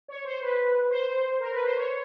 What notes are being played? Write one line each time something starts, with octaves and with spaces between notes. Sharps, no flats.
C#5
C5
B4
C5
A#4
B4
C5
C#5